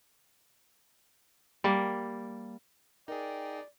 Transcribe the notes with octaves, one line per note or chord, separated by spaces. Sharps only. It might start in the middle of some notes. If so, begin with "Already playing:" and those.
G3 A#3
D#4 G#4 A#4 D5 E5 G5